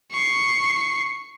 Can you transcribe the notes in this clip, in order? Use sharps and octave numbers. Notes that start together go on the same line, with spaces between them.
C#6 C7